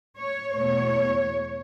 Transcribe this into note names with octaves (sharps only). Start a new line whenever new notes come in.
C#5
E2 B2 A3 C#5